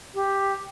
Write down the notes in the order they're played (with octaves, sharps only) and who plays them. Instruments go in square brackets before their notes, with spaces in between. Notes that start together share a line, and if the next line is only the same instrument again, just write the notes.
[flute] G4